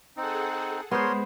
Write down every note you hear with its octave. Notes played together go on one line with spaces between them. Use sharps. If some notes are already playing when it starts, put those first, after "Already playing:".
C4 D#4 G#4 A4 F#5
G#3 B3 A#4 C5 C#5 C6